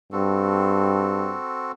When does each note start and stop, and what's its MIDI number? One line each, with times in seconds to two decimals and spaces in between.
0.12 1.36 43
0.12 1.72 60
0.12 1.72 66
0.12 1.72 69